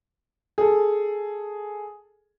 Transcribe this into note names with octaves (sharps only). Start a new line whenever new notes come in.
G#4 A4